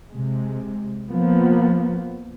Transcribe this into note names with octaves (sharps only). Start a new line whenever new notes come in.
C3 G#3
F3 A#3 B3